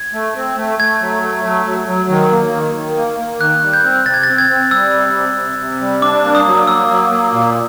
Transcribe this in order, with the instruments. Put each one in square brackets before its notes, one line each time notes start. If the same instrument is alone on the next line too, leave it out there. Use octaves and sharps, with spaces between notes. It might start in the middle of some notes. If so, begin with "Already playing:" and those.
Already playing: [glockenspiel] G#6
[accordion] A3
C4
A3
[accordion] A3 [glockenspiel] G#6
[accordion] F#3
A3
F#3
F#3
F#3
D#3
A#3
D#3
D#3
A#3
A#3
[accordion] D#3 [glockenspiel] F#6
[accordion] G3
[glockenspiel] G6
[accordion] C4
[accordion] C3 [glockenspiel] A6
[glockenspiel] G#6
[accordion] C4 [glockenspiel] A6
[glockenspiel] G#6
[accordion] C4
[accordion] G3 [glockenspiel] E6
[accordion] C3
C3
C3
C3
G3
[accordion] D4 [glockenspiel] D6
[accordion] A#3
[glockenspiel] D#6
[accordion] F#3
[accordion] A#3 [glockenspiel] E6
[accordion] F#3
A#3
A#2